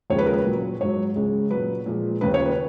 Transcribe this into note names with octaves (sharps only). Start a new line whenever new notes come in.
D#2 C#3 F3 G#3 C#5
B4
A#4
B4
A#2 F#3
G#2 F#3 C#5
C#2 C#3 G#3
F#3 B4
A#2
A#2 F3 G#3
D#2 C#3 F3 B4
C#5
B4